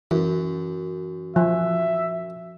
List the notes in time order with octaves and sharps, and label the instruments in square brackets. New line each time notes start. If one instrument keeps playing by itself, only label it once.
[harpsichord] F#2 [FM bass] E3
[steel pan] F3 [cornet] E5